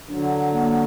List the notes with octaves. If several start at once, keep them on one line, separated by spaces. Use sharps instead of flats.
D3 F#3 D4
A#3